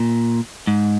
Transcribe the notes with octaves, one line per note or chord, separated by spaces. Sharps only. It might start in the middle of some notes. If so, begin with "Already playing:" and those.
Already playing: A#2
G#2